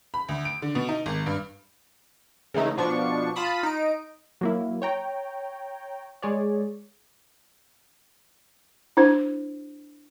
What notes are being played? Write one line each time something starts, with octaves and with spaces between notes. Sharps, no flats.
B5
D2
D7
D3
B2
D#4
G#1
G2
C#3 E3 A3 D#4
B2 F3 D4 C#6
F4 A5 B5 D#6
D#4 D7
F#3 A#3 E4
C#5 G5 A#5
G#3 G#4 C#5 D5
D4 E4 C5